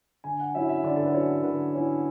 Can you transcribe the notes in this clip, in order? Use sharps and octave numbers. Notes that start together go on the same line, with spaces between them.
D3 G#5
F#5
F#3 C#4 E4 E5
E5
D3 D5
A4
B4
F#3 C#4 E4 C#5
D3 B4
F#3 C#4 E4